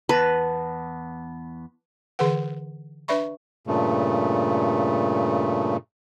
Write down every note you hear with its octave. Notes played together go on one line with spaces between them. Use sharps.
E2 B3 B4 A5
D3 E3 G#4 B4 F#5
D4 B4 D5 E5 B5 C#6
G2 A#2 C#3 A3